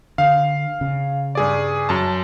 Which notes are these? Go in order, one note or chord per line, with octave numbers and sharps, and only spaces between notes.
D3 F5
C#3
G2 G#4 D5
F#2 A5